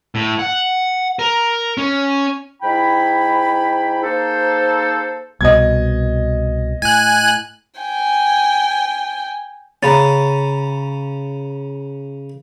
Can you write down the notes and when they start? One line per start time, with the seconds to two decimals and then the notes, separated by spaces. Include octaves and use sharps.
0.15 A2
0.39 F#5
1.19 A#4
1.78 C#4
2.62 G#2 E4 G5 B5
4.02 A#3 D#4 G#4 A4 C5
5.41 C2 B2 D#5 G#6
6.82 A2 G#5 F#6
7.81 G5 G#5
9.83 C#3 C#4 A#5 B5 A6